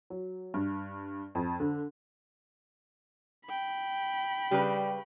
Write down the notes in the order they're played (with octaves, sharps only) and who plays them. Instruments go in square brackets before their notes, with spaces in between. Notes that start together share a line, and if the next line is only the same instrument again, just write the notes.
[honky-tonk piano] F#3
G2
F2
D3
[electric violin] G5 B5
[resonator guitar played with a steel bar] C#3 B4 [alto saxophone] G3 [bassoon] G4